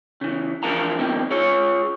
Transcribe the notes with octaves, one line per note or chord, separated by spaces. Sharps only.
C#3 E3
D3 E3 F3 A#4 F5 A#5
B2 D#3 F3 A#3 C4 D#4
F4 G#4 C#5